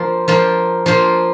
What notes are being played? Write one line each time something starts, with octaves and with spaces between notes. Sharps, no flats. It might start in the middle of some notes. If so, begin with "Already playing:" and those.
Already playing: F3 A#3 F4 C5
F3 A#3 F4 C5
F3 A#3 F4 C5